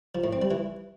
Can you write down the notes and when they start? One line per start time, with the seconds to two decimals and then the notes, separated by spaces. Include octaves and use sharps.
0.15 F3
0.24 A2
0.33 C4
0.42 G3
0.51 E3